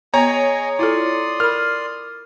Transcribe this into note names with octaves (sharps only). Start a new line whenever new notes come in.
B3 G#4 C#5 D#5 G#5 A#5
E4 F4 A4 D5 C6 D#6
A#4 B5 F6